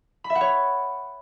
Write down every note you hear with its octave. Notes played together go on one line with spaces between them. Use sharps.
B5
E5
F#5
C#5